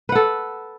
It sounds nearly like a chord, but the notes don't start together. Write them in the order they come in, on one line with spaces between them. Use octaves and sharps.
B4 F#5 A4